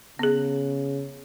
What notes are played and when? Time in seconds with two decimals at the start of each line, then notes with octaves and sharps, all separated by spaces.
0.19 C#3 B3 G#4